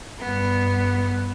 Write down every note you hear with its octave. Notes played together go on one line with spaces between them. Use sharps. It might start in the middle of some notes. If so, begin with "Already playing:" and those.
G2 B3